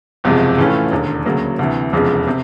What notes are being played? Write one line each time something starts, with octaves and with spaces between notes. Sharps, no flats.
F#1 E2 C3 F3 G#3
A2 E3 A3 C#4 F4
E1 D#2 D3
D2 C#3 F#3 A#3
D2 C3 E3
F1 E2 C#3 F3 G#3
C3